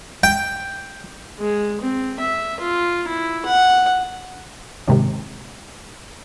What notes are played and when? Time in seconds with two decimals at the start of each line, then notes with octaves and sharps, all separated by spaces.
0.23 G5
1.39 G#3
1.81 C4
2.20 E5
2.60 F4
3.08 E4
3.46 F#5
4.88 D#2 G#2 C3 D#3